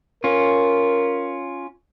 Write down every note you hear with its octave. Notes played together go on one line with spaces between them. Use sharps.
C#4 F4 A#4